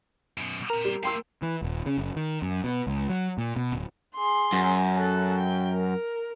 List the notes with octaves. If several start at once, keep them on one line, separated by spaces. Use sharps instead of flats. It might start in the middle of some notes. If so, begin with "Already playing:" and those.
F#2 B2
C4 A#4 A#5
G3
A3 F5 G5 C6 E6
E3
D#1
C#3
F#1
D#3
F#2
B2
C#2
F#3
A#2
B2
D1
G#4 C6
F#2
A4 F#5
G5
A#4